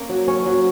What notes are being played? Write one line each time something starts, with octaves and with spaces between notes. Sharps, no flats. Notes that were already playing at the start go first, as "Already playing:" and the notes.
Already playing: A#3 C#4
F#3
C#4
F#3